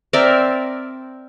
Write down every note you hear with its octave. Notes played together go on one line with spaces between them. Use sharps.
C4 A#4 D5 E5